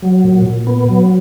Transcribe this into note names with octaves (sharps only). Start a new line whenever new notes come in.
F#3
A#2
A#2
B3
F#3